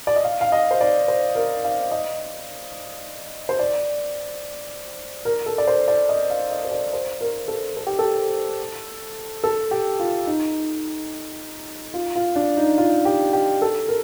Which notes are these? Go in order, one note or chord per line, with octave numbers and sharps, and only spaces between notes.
D5
D#5
F5
F5
D#5
C5
D5
C5
A#4
F5
D#5
C5
D5
A#4
A4
D5
C5
D5
D#5
F5
D#5
C5
D5
C5
A#4
A4
A4
G4
A4
A4
G4
F4
D#4
F4
F4
D4
D#4
F4
G4
G4
A4
A#4